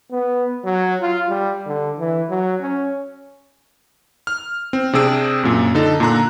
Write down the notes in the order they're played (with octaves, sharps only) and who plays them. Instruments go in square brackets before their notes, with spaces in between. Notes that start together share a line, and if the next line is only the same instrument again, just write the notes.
[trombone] B3
F#3
F4
G3
D3
E3
F#3
C#4
[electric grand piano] F6
C4
C3 C4 D4 G#4 E6 D7
F#2 A#2
D3 D#4 A4
A#2 D3 A#5 F#6